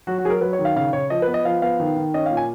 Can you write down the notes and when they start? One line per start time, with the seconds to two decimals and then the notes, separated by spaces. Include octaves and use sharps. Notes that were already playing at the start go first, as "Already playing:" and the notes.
0.07 F#3 F#4
0.18 F#4
0.24 F#3 G#4
0.30 A#4
0.41 F#3 B4
0.53 C#5
0.59 D#3
0.65 F5
0.76 C#3 F5
0.93 C#3 C#5
1.10 F3 D#5
1.22 B4
1.27 B3
1.34 D#5
1.45 F3 F5
1.62 B3 F5
1.80 D#3
1.96 D#3
2.14 C#4 D#5
2.26 F5
2.31 A#2
2.37 G#5